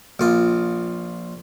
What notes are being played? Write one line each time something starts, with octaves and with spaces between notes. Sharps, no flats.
A#1 F4